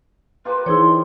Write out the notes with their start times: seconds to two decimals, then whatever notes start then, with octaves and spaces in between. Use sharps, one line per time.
0.45 F4 G4 A#4 B4
0.66 E3 D#4 E4 G#4 C5 C#5 C6